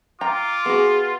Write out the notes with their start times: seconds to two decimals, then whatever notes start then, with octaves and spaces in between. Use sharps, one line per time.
0.21 F4 G5 A#5 D6
0.66 B3 F#4 G#4